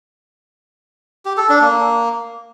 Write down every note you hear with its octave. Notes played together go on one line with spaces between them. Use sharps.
G4
A4
D4
A#3